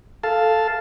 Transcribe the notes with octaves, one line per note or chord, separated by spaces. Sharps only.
A4 F5 A5